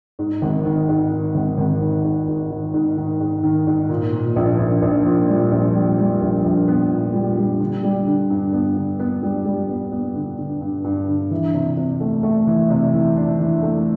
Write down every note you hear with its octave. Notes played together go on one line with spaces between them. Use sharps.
G#2
G#1
D#3
G#2
D#3
G#1
G#1
D#3
G#2
G#2
D#3
G#2
D#3
G#2
D#3
G#2
A#2
A#2
A#1
A#1
A#1
A#2
G3
A#1
G3
G3
A#1
A#1
B3
A#2
G3
G3
D3
G3
D3
G2
B3
D3
B3
G3
G3
B3
B3
D3
D3
G2
G2
D3
E3
C3
C3
A3
A3
E3
C3
E3
D4
E3
A3